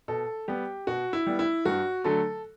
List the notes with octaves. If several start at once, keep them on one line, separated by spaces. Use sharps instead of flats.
B2 A4
G3 B3 G4
B2 F#4
E4
G3 B3
E4
G2 F#4
D3 F#3 A3 A4